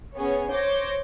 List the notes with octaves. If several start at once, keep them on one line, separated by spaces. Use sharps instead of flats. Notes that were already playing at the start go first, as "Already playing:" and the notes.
B3 C#4 G#4 C#5
C5 C#5 D6 G6 A#6